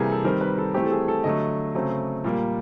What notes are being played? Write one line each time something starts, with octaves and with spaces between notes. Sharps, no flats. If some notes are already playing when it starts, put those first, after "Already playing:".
Already playing: C3 E3 G3 A#3 G#4 A#4
A4
D#3 G3 C4 A#4
B4
A4
E3 A3 C4 G4
A4
G#4
A4
D3 F#3 A3 D#5
C#3 F#3 A3 C4
A#2 G3 A#3